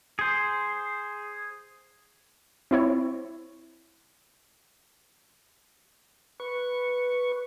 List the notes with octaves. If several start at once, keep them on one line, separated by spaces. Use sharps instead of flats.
G#4 C5
C4 E4 C#5
B4 C#6